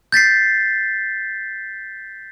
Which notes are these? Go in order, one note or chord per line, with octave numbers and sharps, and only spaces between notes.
G6 A6 B6 C7